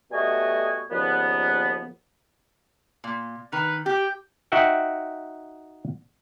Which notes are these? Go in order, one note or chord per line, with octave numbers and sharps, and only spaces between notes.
B2 G3 A3 F#4 D#5 G#5
D#2 A#2 C#3 F3 B3
A#2
D#3 B4
G4 G5
D#4 F#4 E5 F#5 G5